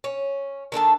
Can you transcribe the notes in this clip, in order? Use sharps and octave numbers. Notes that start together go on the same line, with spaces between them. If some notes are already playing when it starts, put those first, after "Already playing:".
C#4
D#3 D4 A4 A5